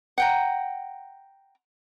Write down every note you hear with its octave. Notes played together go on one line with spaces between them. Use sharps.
F#5 G5 A#5